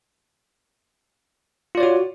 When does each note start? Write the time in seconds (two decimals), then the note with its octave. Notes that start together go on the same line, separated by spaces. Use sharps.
1.75 F4
1.77 D5
1.80 C#5
1.83 F#4